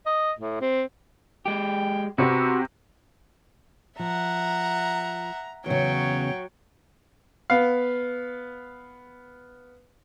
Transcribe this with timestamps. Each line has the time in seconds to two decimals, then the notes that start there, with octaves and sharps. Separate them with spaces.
0.06 D#5
0.39 A2
0.61 C4
1.46 G#3 G4 G5
2.18 C3 B3 C4 F#4 G4
3.99 F3 E5 F#5 A#5
5.66 E2 C#3 F#3 C#5 G5
7.50 B3 F5